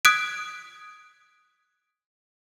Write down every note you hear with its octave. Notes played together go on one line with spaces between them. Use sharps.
D#6 F#6 G#6 B6 D7